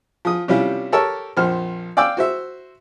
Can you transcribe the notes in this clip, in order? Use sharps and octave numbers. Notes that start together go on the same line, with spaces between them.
F3 D#6
C3 G3 C#4 E4 F4 G4
G4 A4 A#4 C#5 A5 E6
A#1 F2 C5 F6
D5 F5 G5 D6 E6
F#4 C5 E5